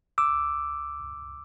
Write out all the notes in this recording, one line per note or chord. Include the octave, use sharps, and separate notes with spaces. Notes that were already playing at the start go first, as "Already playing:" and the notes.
D6 E6